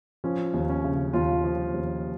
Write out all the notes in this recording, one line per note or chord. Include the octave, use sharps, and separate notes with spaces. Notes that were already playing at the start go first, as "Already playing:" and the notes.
F3 C#4
D#2
C#4
C#3
D#2 F4
F3
D#2